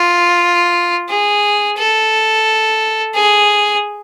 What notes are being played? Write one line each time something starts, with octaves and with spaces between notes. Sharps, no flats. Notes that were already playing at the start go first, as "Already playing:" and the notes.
Already playing: F4
G#4
A4
G#4